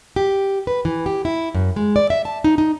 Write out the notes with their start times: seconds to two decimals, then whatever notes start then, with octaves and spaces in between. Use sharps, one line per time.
0.16 G4
0.67 B4
0.85 E3
1.06 G4
1.25 E4
1.55 F#2
1.76 G#3
1.96 D5
2.10 E5
2.25 A5
2.44 D#4
2.58 D#4